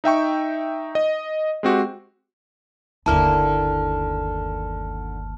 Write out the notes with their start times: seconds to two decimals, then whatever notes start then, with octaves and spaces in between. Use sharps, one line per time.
0.04 D#4 E5 G5 C#6
0.95 D#5
1.63 G#3 C4 F#4 G4
3.06 G1 D#2 D3 A#3 E4 A5 F6